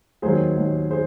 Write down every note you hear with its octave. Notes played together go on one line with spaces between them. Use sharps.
D#2 D#3 F#3 G#4 C5
D#2 D#3 F#3
G#4 C5